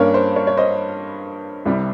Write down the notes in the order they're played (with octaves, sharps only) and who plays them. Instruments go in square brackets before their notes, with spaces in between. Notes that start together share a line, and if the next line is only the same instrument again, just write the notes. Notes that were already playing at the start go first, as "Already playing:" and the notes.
Already playing: [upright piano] G2 G3 A#3 C#4 A#4 C#5
C5
A#4 C#5
C#5
C5 D#5
C2 C3 G3